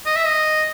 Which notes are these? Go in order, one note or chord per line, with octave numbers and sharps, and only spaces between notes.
D#5
E5
D#5